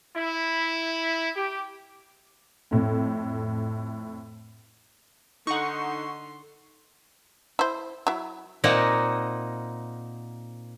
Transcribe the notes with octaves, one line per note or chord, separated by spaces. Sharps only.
E4
G4
F2 A2
D3 D#4 F#5 C6 C#6
E4 C5
F#3 E4
A#2 A#3 C4 D#4 F#5 A#5